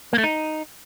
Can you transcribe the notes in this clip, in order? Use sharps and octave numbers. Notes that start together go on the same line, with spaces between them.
A#3
A3
D#4